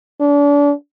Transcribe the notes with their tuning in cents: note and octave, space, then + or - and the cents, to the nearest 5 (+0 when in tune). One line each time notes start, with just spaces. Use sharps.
D4 -35